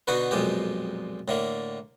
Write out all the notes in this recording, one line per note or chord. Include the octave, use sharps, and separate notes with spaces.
B2 D3 D#4 F#4 B4
B1 F2 A#2 G#3 G4
A2 D3 A#3